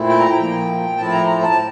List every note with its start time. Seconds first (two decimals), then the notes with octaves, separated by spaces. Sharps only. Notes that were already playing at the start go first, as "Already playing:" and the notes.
Already playing: A#2 A3 C4 E4
0.09 G5
0.19 A#5
0.29 G5
0.39 A#2 F3 A#3
0.97 A2 F3 C4 E4 A5
1.12 A#5
1.27 A#5
1.42 A5